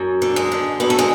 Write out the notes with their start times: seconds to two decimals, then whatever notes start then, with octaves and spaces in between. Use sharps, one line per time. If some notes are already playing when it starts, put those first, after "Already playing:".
Already playing: F#2
0.22 D3
0.36 G#3
0.52 D3
0.80 F#2 B3
0.90 A3
0.99 G#3